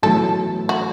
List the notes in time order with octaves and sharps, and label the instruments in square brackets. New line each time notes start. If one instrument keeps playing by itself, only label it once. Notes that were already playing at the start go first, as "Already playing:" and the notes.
[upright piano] B1 A2 E3 A3 [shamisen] A4
[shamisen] F#4